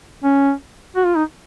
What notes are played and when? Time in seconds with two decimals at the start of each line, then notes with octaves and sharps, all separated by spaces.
0.24 C#4
0.96 F#4
1.06 F4
1.16 D#4